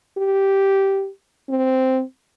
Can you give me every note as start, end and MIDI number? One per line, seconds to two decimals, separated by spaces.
0.18 1.09 67
1.49 2.03 60